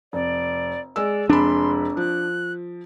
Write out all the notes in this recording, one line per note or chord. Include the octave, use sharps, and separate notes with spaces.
F1 D5
G#3 D5 E6
F1 G#3 D4 B5 C6
F3 F#6